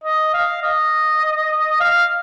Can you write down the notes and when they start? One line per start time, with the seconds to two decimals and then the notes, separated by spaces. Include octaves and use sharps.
0.04 D#5
0.33 F5
0.62 D#5
1.80 F5